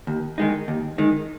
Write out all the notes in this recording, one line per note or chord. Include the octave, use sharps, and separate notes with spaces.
D#2
D#3 G#3 D#4
D#2
D#3 G#3 D#4